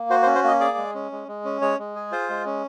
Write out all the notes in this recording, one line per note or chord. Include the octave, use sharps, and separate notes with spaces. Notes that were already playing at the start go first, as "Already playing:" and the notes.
Already playing: A#3
F#4 C5
C5
C#4
C5
A#3 D#5
G#4 D5
G#3
C#4
G#3
G#3
C#4
G#3 C#5
G#3
G#4
F4 C5
G#3
C#4